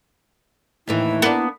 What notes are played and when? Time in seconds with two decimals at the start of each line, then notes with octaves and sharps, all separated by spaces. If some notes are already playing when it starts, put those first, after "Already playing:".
0.87 D#2 A2 E3 E4
1.22 A#3 B3 D4